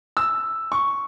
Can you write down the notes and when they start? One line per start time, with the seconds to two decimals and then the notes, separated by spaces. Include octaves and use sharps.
0.17 E6
0.72 C#6